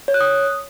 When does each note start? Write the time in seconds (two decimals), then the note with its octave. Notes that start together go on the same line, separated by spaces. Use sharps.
0.08 C#5
0.14 F#6
0.21 D#6